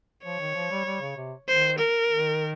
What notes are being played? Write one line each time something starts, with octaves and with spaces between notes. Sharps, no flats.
F3 C#5
D#3
F3
G3
G3
C#3
C3
D#3 C5
A#4
D#3